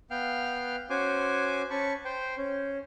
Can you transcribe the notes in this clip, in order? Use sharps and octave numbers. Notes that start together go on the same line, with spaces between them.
B3 F5 G5 F6
C#4 F#4 C5 G#5 D6
C#4 A5 B5 C#6
C5 G5
C#4